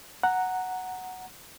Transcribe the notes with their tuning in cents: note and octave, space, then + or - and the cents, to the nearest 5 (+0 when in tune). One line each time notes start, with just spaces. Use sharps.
F#5 +0 A#5 -5